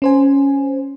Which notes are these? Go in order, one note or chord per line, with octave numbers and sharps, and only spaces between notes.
C#4 C5 G#5